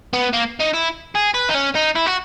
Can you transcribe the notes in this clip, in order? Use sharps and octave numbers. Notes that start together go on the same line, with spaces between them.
B3
A#3
D#4
E4
G#4
B4
D#4
C#4
D#4
E4
F#4